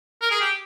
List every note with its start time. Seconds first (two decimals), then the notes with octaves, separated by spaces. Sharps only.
0.21 A#4
0.31 G#4
0.40 G4